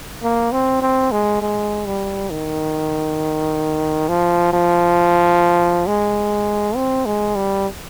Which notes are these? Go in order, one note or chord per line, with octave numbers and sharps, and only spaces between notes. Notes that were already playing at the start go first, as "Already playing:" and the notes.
A#3
C4
C4
G#3
G#3
G3
D#3
F3
F3
G#3
C4
G#3
G3